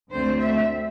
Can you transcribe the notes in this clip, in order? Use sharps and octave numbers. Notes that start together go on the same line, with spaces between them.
D2 D3 A3 C4 C5
E5